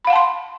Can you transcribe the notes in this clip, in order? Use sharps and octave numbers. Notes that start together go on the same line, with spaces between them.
F5 F#5 A5 B5 C6